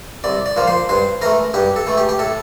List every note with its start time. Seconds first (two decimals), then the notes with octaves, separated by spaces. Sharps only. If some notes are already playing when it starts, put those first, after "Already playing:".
0.24 C2 D5
0.46 D5
0.57 A#2 F3 A#3
0.67 C5
0.89 G2 C5
1.21 E3 A3 A#4
1.54 G2 G4
1.76 A4
1.87 E3 A3
1.97 G4
2.09 G4
2.19 A2 A4